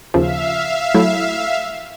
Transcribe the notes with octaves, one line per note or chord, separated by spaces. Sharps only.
D#2 C#3 F3 E5 F5
F#3 A3 E4